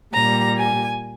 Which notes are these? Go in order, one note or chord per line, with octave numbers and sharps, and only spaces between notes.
A#2 G3 A#5
G#5